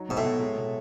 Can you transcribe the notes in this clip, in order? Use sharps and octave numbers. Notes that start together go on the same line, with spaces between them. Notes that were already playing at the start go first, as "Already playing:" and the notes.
Already playing: F#3 D#4
G#2 B2
A2
B2
G#3
B2